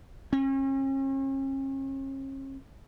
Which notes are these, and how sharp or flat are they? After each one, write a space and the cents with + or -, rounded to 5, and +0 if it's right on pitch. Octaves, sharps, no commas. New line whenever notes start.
C#4 -40